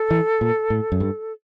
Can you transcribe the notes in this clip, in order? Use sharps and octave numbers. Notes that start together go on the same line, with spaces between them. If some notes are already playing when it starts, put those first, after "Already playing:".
Already playing: A4
E3
A#2
A2
F#2
G2